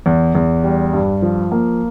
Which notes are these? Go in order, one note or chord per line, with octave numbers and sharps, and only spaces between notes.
E2
E2
G3
G2
F3
A#3